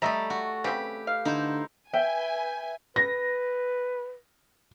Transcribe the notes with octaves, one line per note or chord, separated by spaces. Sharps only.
G3 A3 A4 D#5 E5 A#5
F#4
C#3 C4 G4 B4
F5
D3 D#4 E4 C5
B4 E5 G5 G#5
B4 A#6